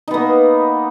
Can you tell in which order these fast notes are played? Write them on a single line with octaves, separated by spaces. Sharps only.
D#4 B3 A#3